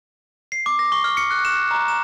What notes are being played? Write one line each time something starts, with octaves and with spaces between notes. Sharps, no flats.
C7
D6
A#6
C#6
F6
C#7
F#6
E7
A#5
E7